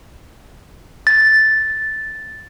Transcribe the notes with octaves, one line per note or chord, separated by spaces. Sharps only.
A6